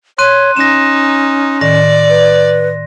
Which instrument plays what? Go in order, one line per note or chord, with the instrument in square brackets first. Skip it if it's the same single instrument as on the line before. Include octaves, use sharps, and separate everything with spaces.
[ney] C#5 [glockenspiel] C6 F#6 D#7
[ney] C#4 [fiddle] D#4 [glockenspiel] A#6 E7
[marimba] A2 D#3 [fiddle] D5 [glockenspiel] A#6
[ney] B4